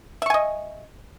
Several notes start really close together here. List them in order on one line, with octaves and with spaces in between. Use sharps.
E5 C#6 G#5 D#5